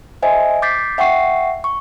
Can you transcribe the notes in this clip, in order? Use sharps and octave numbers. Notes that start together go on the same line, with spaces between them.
C5 D#5 E5 G#5
D6 G6 A6 B6 C7
E5 F#5 G5 C#6 C7
C#6